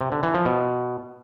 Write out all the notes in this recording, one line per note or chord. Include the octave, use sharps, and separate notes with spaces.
C3
D3
E3
F3
B2